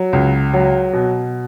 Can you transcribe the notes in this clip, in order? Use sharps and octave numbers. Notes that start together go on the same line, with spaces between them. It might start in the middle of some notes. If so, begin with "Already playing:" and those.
Already playing: F#3
C#2
F#3
B2